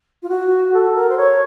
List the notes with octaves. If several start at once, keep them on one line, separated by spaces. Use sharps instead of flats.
F4
F#4
A4
A#4
C5
C#5